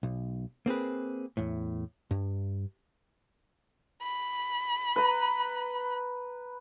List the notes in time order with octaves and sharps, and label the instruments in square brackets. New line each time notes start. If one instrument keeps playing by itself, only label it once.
[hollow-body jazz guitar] B1
A#3 C4 G#4 B4
E2 A2
G2
[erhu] B5
[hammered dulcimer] B4 A#5